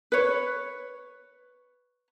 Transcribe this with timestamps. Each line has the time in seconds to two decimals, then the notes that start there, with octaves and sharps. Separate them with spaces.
0.12 B4 C#5